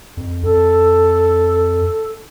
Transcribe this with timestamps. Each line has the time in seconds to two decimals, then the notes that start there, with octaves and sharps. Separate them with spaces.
0.17 F2
0.43 F2 A4